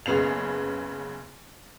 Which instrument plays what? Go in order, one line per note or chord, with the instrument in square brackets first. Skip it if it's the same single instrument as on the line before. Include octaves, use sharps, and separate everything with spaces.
[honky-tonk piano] F#1 C#3 B3 C7 F7